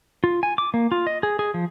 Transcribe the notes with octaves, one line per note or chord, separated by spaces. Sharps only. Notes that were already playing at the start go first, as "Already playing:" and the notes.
F4
G#5
D6
A#3
F4
D#5
G#4
G#4
F3